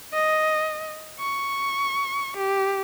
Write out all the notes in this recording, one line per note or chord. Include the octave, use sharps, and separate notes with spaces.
D#5
C#6
G4